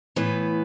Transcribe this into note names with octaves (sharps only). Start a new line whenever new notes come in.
A2 E3 B3